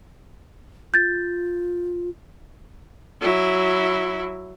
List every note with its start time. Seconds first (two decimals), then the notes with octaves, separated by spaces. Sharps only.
0.94 F4 G6 A6
3.21 F#3 E4